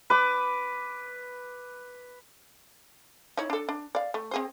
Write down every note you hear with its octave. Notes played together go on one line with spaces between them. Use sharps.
B4 D6
D#4 E4 C#5
D4 A4
D4
D5 F5
A3
C4 G#4 C5